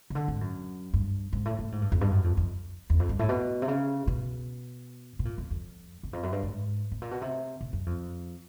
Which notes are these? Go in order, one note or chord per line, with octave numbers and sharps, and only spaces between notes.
C#3
D3
G#2
F#2
G2
G#2
A2
A2
G#2
G2
F2
G2
F#2
F2
F2
E2
F2
G2
A2
B2
C3
C#3
B2
B2
A#2
F2
F2
E2
F2
F#2
G2
G#2
A2
A#2
B2
C3
B2
F#2
F2